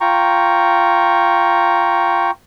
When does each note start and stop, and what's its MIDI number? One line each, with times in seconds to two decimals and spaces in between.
0.01 2.31 65
0.01 2.31 79
0.01 2.31 82
0.01 2.31 85